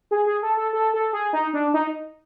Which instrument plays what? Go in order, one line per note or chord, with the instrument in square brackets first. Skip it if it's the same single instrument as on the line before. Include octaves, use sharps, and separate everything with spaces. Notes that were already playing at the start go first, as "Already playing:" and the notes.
[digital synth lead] G#4
G#4
A4
A4
A4
A4
G#4
D#4
D4
D#4